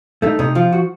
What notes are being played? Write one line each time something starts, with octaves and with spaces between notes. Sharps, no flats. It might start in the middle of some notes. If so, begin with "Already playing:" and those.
A3 D#4
C3 D#4
F3 F4
F#4